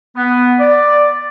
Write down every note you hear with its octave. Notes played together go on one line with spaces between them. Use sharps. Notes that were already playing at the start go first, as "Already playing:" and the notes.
B3
D5